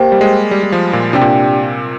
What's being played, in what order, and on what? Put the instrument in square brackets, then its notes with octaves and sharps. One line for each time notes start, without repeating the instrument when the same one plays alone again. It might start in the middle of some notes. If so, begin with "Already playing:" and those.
Already playing: [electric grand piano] A#3 [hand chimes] G4 C5 G5
[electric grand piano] G3
G#3
G3
G3
F3
A#2
[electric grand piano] C3 [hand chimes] D4 G4 D5 G5
[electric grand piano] A#2